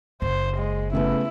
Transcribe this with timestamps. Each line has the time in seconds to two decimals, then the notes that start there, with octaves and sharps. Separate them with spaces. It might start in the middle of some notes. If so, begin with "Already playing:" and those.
0.22 F#1 C5
0.57 G#3
0.93 C#3 A3 B3 E4